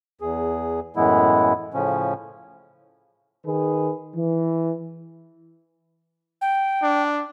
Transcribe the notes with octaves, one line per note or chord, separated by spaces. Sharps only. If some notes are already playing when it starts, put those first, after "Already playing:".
E2 G#4
F#2 A2 E3 G#3 B3 E4
A2 C#3 F3 C#4
D#3 G#4 B4
E3
G5
D4